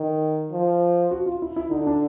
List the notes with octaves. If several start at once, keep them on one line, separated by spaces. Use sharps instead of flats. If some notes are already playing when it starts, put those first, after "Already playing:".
Already playing: D#3
F3
F#4
F4
E4
E4
D3 D#4
D4